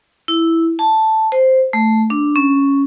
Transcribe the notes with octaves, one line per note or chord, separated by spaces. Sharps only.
E4
A5
C5
A3
D4
C#4